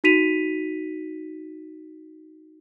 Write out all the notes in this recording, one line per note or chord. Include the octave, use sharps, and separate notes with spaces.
D#4 F#4 B6 D#7 F7